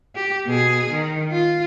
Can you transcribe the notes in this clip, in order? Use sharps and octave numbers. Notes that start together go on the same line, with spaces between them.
G4
B2 G#4
D#3
F4